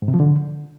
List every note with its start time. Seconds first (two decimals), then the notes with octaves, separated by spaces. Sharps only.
0.02 G#2
0.08 C3
0.14 F3
0.20 D3